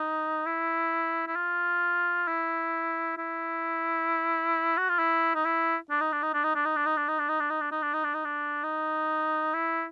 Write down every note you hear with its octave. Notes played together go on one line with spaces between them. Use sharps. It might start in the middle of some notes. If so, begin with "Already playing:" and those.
Already playing: D#4
E4
E4
F4
E4
E4
F#4
F4
E4
D#4
E4
D4
D#4
D4
D#4
D4
D#4
D4
D#4
D4
D#4
D4
D#4
D4
D#4
D4
D#4
D4
D#4
D4
D#4
D4
D#4
D4
D#4
E4